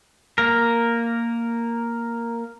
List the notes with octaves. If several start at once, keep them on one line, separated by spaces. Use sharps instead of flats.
A#3 A#4